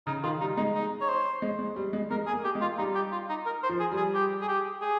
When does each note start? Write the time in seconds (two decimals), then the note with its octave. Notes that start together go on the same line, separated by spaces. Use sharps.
0.07 C#3 D#4
0.23 D#3 F4
0.40 G3 D#4
0.57 G#3 D#4
0.75 D#4
1.01 C#5
1.08 C5
1.42 G#3
1.59 G#3
1.76 G3
1.93 G#3
2.10 G#3 A#4
2.27 G#4
2.33 A#3
2.44 G4
2.55 G#3
2.61 F4
2.78 G3 D#4
2.95 G4
3.12 F4
3.29 D#4
3.46 A#4
3.63 C5
3.69 F3
3.80 G#4
3.92 G3
3.97 G#4
4.14 G4
4.42 G#4
4.48 G4
4.82 G#4